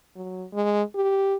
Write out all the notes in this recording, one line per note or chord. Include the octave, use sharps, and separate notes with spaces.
F#3
G#3
G4